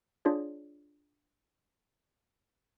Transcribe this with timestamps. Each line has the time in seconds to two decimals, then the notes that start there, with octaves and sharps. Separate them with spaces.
0.25 D4 F4 G#4 C#5 D5